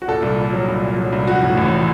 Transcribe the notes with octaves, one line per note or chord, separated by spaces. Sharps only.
F#4
A#2 A4
C2
A#2
F#3
C2
A#2
F#3
C2
F3 F#4
A2
A1